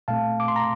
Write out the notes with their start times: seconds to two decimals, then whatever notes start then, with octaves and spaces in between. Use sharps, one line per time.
0.08 A#2 A3 C4 F5 A5
0.40 D6
0.48 C6
0.56 A#5